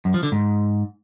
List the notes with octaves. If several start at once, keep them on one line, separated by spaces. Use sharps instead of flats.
F#2
F3
D3
G#2